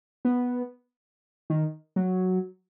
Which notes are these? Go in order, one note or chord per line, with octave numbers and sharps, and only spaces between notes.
B3
D#3
F#3